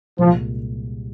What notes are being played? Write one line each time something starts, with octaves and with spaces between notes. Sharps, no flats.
C2 A#2 F3 G#3